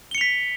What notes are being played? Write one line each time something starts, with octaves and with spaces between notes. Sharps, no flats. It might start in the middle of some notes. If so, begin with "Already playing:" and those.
B6 C#7 F7 G7